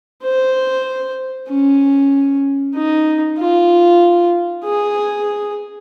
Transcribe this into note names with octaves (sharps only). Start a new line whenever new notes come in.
C5
C#4
D#4
F4
G#4